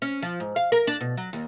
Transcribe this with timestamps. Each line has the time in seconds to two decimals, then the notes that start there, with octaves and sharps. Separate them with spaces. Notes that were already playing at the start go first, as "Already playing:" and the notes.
0.02 C#4
0.22 F3
0.40 G#2
0.56 F5
0.72 A#4
0.87 D4
1.01 B2
1.17 F#3
1.33 D#2